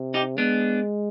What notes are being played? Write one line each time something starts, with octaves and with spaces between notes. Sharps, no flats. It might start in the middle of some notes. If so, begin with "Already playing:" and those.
Already playing: C3
D#4 G4
G#3 B3 D4